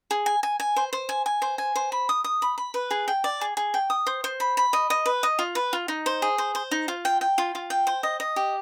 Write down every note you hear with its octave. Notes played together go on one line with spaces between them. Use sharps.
G#4
G#5
G#5
G#5
C5
C5
G#5
G#5
C5
G#5
C5
B5
D#6
D#6
B5
B5
B4
G#4
G5
D5
G#4
G#4
G5
D#6
C5
C5
B5
B5
D#5
D#5
B4
D#5
F4
B4
F4
D#4
C5
G#4
C5
C5
D#4
F4
G5
G5
F4
F4
G5
C5
D#5
D#5
G4